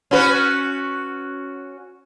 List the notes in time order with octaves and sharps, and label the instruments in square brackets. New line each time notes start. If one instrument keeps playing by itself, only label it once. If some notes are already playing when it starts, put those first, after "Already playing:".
[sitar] C#4 F#4 B4